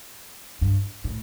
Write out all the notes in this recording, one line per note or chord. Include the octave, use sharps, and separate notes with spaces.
G2
A2